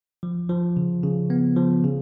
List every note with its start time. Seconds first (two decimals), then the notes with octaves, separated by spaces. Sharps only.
0.23 F3
0.50 F3
0.77 C#3
1.04 C#3
1.30 B3
1.56 F3
1.84 C#3